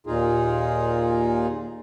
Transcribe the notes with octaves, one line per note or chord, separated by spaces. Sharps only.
D#2 A#2 D#4 F4 G#4